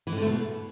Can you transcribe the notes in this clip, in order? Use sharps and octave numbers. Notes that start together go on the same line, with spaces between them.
E3
A2
D3
A3
B2